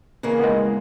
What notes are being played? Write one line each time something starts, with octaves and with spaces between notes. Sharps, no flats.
C#3 E3 A#3
G#3 B3